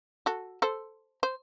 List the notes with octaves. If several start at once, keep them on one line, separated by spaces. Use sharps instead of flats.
F#4 A4
A4 C5
C5